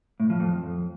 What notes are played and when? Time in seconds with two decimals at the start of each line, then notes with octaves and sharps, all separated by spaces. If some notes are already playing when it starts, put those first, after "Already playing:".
0.20 A2
0.30 F3
0.40 F2